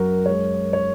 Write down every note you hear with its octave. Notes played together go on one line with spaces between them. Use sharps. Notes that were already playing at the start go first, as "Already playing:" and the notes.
Already playing: F#2 F#3 F#4 A#4
G#3 C#5
C#5